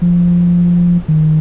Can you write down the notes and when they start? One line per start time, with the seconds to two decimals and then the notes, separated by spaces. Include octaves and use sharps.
0.02 F3
1.08 D#3